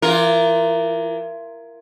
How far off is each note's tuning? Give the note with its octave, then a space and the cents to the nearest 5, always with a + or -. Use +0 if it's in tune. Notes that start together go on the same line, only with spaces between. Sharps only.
E3 +30 F4 +5 A#4 +0